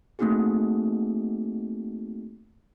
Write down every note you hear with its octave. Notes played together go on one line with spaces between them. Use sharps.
A3 A#3 C4 D#4 F#4 G#4